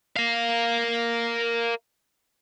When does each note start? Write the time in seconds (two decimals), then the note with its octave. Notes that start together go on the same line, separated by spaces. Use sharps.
0.16 A#4 F5